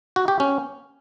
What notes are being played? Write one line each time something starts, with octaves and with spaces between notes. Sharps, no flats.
F#4
G4
C#4